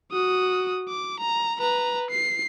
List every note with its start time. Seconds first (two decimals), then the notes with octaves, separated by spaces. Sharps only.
0.12 F#4 D#6
0.88 D6
1.20 A#5
1.60 B4 A#5
2.11 C7